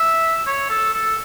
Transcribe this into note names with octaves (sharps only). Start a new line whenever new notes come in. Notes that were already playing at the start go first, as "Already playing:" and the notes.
Already playing: E5
C#5
A4
A4